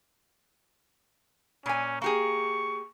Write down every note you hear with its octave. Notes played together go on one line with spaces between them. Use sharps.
A#2 C#4 G#5
A#3 G4 G#4 C#6